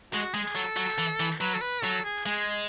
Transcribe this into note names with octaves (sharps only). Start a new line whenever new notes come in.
G#3 F#4
G#3 G#4
F#3 A4
F#3
E3
E3
F#3 B4
A4
B4
F#3 A4
G#4
G#3 G#4